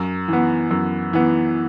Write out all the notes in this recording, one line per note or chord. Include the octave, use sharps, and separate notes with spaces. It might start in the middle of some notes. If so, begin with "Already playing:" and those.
Already playing: F#2
E3 B3
F#2
E3 B3